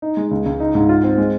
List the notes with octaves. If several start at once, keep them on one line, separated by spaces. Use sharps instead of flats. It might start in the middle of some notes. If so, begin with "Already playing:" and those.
D#4
G#3
C#2
C#2
D#4
G#2
F4
C4
G#3